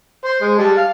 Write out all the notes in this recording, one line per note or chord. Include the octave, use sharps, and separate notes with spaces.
C5
G#3
G3 A5
F5